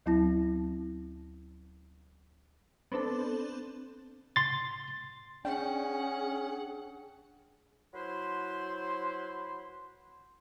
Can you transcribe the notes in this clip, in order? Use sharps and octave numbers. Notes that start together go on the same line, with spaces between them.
D2 F#3 C4 E4 A5 A#6
B3 C4 D4 A4
C6 A6
C#4 D4 G#4 F#5 G5
F#3 E4 B4 C5 C6